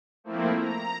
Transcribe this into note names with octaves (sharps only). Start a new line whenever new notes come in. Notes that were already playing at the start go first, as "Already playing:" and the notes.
F3 A3 A#3 C4 E4
A#5